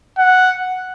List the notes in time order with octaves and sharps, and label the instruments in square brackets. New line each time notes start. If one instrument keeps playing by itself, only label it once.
[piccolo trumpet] F#5